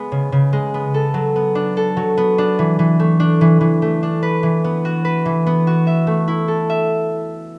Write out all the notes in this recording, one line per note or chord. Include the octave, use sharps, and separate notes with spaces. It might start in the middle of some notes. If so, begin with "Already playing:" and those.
Already playing: G#3 B3
C#3
C#3
G#3
B3
A4
F#3
B3
D4
A4
F#3
B3
D4
E3
E3
A3
D4
E3
E3
A3
D4
B4
E3
B3
F#4
B4
E3
B3
F#4
E5
A3
E4
A4
E5